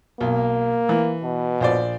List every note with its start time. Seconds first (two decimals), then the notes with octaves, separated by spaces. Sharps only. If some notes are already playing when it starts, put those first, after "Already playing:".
0.21 B1 A#3
0.89 E3
1.23 B2
1.61 A#1 C5 D5